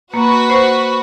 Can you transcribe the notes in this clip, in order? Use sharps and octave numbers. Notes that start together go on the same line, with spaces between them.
A#3 F#4 B4
C5